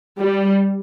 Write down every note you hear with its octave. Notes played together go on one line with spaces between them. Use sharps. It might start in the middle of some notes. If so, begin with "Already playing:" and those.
G3